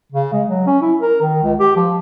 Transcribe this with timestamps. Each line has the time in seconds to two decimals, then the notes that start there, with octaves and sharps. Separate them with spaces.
0.12 C#3
0.33 G#3
0.49 F#3
0.67 C#4
0.82 E4
1.00 A#4
1.22 D#3
1.43 C#2
1.59 G4
1.76 F3